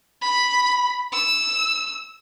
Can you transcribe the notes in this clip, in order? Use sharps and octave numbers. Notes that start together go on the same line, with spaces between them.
B5
E6